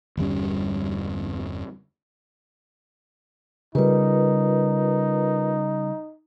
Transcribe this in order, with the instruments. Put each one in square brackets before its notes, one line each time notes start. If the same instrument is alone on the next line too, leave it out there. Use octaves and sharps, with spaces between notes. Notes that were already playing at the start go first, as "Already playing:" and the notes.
[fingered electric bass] G1 E2 G3 C#4
[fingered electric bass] C#3 G3 [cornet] D#4 [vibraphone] F4 A#4 B4